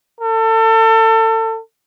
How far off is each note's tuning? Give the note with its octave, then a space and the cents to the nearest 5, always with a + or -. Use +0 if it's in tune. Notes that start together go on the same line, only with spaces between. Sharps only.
A4 +30